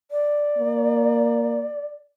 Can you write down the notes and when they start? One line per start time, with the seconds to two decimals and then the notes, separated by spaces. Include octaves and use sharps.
0.11 D5
0.59 A#3